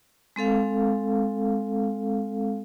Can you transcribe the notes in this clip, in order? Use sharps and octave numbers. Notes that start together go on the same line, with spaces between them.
G#3 C4 A4 F5